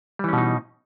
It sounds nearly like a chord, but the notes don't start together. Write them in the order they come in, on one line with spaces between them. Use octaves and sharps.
G3 E3 C#4 B2 D#4